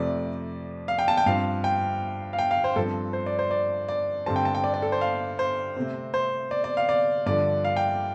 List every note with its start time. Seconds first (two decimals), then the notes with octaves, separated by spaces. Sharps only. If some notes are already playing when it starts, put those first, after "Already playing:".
Already playing: F2 C3 A3 D5
0.88 F5
0.99 G5
1.08 A5
1.17 G5
1.26 G2 F3 C4 F5
1.64 G5
2.33 F5
2.39 G5
2.51 F5
2.64 C5
2.76 G2 F3 C4 A4
3.13 C5
3.26 D5
3.39 C5
3.51 D5
3.89 D5
4.26 G2 D3 G3 C4 A5
4.36 G5
4.45 A5
4.55 G5
4.64 D5
4.74 D5
4.82 A4
4.92 C5
5.01 F5
5.39 C5
5.76 C3 A3 C4
6.14 C5
6.51 D5
6.64 D5
6.77 F5
6.89 D5
7.26 G2 D3 F3 D5
7.65 F5
7.77 G5